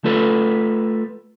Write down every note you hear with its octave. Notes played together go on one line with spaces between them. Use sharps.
A3 F4 A4 B4